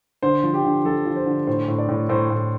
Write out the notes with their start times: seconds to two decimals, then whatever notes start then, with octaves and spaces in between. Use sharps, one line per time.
0.22 D3 C5
0.43 F3
0.54 G4
0.64 D3
0.85 F3 A4
1.06 F3
1.16 C5
1.26 D3
1.47 A2 C5
1.68 A2
1.78 D5
1.89 A2
2.09 A2 C5
2.30 A2